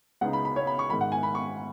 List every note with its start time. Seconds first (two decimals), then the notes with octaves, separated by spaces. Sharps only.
0.21 C#2 C#3 B3 D#4 F#5
0.33 B5
0.45 B5
0.56 C#5
0.67 B5
0.79 C#6
0.90 G#2 D#3 G#3 B5
1.01 F#5
1.12 G#5
1.23 B5
1.35 C#6